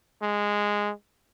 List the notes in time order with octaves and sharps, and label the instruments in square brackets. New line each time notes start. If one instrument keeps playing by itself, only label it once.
[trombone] G#3